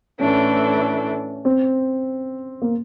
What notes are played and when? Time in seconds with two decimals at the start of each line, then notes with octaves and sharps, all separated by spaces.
0.20 A2 E3 A3 C#4 D4
1.45 C4
2.62 A#3